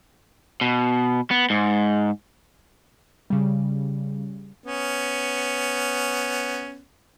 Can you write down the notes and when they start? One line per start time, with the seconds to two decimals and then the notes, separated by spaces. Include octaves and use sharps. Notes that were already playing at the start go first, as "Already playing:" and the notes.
0.61 B2
1.31 B3
1.50 G#2
3.30 C#3 G3
4.64 B3 C#4